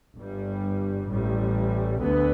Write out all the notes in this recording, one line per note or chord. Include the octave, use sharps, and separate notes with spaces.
G1 G2 G3
A1 A2 G3
D2 D3 B3